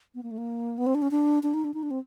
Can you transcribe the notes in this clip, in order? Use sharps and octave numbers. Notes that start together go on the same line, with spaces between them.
B3
A#3
A3
A#3
B3
C4
D4
C#4
D4
D4
D#4
D4
D#4
D4
C4